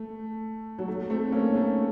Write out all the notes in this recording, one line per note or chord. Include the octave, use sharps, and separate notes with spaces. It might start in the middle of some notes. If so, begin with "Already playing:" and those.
Already playing: A3
F#3
A3
A3 C4
A#3 C#4
A3